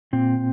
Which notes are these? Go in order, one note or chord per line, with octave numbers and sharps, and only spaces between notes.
A#2 C4